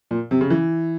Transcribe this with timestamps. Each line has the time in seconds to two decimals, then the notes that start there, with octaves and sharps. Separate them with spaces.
0.11 A#2
0.31 C3
0.41 C#3
0.50 E3